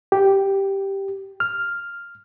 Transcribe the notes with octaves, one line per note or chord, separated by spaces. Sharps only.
G4
F6